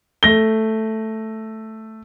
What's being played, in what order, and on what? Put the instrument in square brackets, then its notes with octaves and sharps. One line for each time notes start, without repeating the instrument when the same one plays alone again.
[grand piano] A3 A#6 G7